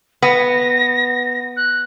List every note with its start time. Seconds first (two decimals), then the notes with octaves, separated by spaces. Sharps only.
0.22 B3 A#6
1.56 F#6